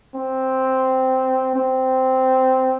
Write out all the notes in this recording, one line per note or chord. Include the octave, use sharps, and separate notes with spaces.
C4
C4